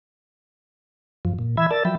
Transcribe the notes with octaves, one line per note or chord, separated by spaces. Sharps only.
F#2 F3
A#2
E3 E5 B5 E6 G#6
A#4 D5 A5 E6 A6
F3 F#3 E5 G5 B5